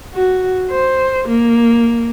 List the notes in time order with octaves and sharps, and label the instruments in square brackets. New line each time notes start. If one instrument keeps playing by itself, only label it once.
[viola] F#4
C5
A#3